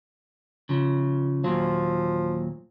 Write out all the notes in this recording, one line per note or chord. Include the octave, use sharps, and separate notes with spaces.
C#3 F3
D#2 A#2 F3 F#3